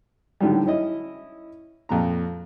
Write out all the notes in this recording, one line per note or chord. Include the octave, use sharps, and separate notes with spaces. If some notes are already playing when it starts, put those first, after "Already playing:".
A2 D3 D#3 F#3 G3
C#4 E4 D#5
F2 A#2 A#5